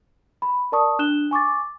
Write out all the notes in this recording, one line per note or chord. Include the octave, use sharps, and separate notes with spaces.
B5
A#4 D5 A5 C#6 D#6
D4 F#6 E7 G7
G#5 C#6 D6 A6